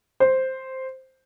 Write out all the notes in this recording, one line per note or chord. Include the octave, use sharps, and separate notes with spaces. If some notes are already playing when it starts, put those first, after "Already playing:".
C5